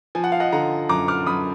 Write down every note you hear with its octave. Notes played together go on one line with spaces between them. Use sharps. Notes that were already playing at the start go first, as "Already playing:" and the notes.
F3 G#5
F#5
F5
D#5 F#5
D3 F#5 A#5
F#2 A#5 D6
D6 F6
F#2 B5 D#6